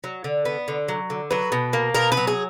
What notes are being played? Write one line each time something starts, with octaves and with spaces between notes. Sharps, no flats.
F#3
D3
B3
D3
F#3
D3
F#3 B4
B2
A#3
B2 A#4
B4
F#3
G#4